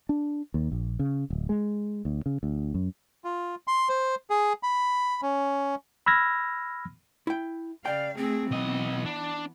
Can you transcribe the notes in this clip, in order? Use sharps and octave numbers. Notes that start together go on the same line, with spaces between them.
D4
D#2
A#1
C#3
D1
G#3
D2
C#3
D2
F#2
F4
C6
C5
G#4
B5
C#4
B5 E6 F6 G#6 A#6
E4 G5
C#3 D5 F5 G5
A3 C4 G#4
B1 E3 B3 D#5
D4